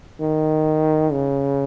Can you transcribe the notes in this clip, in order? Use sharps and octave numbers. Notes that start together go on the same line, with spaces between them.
D#3
C#3